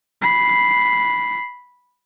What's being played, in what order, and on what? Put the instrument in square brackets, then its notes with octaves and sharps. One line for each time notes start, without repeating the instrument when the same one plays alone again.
[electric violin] B5 C7